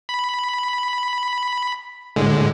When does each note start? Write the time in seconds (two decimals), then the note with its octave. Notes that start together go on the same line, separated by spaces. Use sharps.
0.09 B5
2.16 A2 D3 G#3